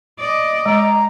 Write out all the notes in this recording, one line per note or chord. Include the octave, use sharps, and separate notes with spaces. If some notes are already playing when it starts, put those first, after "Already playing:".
D5 D#5
G#3 A#5